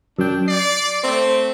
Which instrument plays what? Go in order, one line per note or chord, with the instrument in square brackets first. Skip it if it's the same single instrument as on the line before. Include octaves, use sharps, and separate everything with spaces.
[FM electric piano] F#2 G5 [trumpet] D4
[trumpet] D5 [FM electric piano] C7
[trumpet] A3 [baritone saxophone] C4